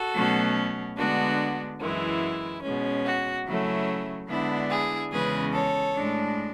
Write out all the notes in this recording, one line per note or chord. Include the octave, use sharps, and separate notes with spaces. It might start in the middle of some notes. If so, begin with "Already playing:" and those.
Already playing: F#4 A4
B2 F#3 A3 C#4
D3 G#3 B3 D4 F#4
F#2 E3 G#3 E4
B2 G#3 C#4
F#4
C#3 F#3 A3 C#4 E4
D3 G#3 B3 D4 E4
E4 G#4
E2 C#3 G#3 C#4 G#4 B4
A4 C#5
A2 G#3 D4